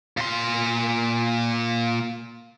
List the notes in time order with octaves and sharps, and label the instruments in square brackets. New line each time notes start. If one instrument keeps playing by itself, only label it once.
[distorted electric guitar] A#2 C6